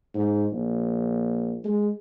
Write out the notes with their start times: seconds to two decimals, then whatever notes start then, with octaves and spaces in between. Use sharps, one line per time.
0.15 G#2
0.52 A#1
1.64 G#3